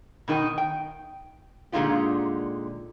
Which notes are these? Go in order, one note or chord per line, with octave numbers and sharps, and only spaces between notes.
B2 D#3 D#4 A#4 G5
G5
A#2 D3 G#3 D#4 F4 G4